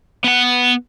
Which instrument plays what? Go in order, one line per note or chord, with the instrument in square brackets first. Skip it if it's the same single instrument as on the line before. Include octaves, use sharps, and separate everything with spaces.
[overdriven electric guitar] B3 F#5